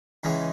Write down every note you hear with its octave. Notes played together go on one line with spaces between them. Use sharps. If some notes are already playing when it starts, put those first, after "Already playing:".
C#2 C#3 E3 G#3